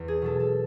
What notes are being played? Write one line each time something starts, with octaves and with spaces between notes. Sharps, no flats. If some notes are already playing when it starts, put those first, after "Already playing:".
Already playing: E2
G#4
B2 F#3 A4
A4